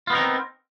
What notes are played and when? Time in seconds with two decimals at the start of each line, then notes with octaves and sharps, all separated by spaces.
0.07 F4
0.10 B3
0.12 D#4
0.15 A#4
0.17 C4